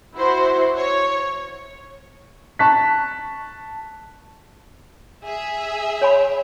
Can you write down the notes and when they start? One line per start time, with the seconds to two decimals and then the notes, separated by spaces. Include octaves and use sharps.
0.16 E4 F#4 C5
0.77 C#5
2.59 A5 C#6 F#6 B6
5.25 G#4 E5
6.02 C#5 G#5 B5